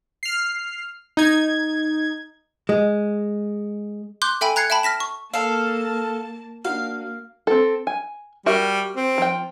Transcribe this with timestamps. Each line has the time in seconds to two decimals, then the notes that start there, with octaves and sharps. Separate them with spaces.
0.23 F6 C7
1.17 D#4 G#6
2.69 G#3
4.22 C6 D6 F#6 G6
4.41 A4 E5 G5 G#5 B5
4.56 A#5 F#6 G#6 C7 C#7
4.70 E5 G5 A5 B5
4.83 F6 A#6 B6 E7
5.00 C#6
5.34 A#3 A4 F5 A5
6.65 A#3 D4 F#4 F5
7.47 C4 A4
7.87 G#5
8.46 G3 F#4 A#4 E5
8.96 C4
9.18 F3 G5